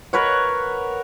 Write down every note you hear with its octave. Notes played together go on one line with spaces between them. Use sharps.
A#4 B4 C#5 F#5